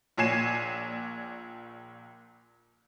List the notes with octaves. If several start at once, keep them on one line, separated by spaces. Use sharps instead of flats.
A#1 A#2 C#5 G#5 C7 E7